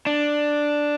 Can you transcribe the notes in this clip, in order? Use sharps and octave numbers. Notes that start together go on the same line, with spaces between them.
D4